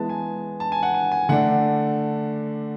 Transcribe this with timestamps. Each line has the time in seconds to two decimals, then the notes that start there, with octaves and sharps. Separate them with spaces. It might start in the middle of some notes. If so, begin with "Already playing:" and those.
Already playing: E3 G#3 B3 A5
0.09 G#5
0.60 A5
0.72 G#5
0.83 F#5
0.94 G#5
1.12 G#5
1.29 D3 A3 D4 F#5